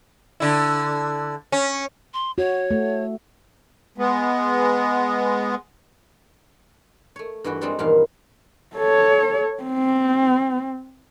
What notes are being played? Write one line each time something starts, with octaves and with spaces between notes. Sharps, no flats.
D3 E4
C#4
C6
F#4 C#5
A3
G#3 B3
A3 C#5
G2 E3 E4 F#4 G5
G3 G#3 C4 D4 A4 C5
E2 G2 A#2 D#3 E4 F5
A4 C#5
C4